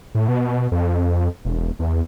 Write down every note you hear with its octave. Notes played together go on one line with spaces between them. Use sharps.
A2
B2
F2
E1
E2